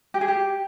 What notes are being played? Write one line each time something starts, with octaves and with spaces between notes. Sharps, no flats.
G4
G#4
G4